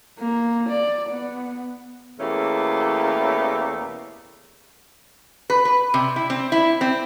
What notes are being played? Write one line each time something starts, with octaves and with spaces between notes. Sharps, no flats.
A#3
D5
B3
E2 B2 A3 A#3 C#4 G4
B4
B4
C3
E4
C4
E4
C4